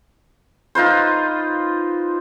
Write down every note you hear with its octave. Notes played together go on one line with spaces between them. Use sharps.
D#4 F4 B4 C5